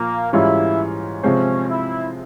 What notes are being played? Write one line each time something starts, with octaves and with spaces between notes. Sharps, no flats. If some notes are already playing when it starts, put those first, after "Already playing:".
Already playing: A#2 F3 A#3
G#2 E3 G3 C#4 E4 F4
C3 F3 G#3 C4 C#4
E4